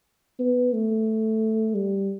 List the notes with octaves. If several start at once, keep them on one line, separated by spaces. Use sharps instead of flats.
B3
A3
G3